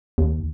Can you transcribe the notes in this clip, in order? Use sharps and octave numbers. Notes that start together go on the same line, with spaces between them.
D#2